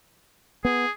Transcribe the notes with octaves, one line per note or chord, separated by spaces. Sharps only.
B3 G#4